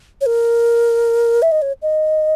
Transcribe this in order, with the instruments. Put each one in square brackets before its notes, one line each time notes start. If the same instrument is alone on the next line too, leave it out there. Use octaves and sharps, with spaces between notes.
[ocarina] C#5
A#4
E5
D#5
C#5
D#5